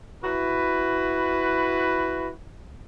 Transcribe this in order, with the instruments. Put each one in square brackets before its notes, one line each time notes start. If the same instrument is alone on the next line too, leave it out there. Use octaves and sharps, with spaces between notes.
[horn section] E4 F#4 B4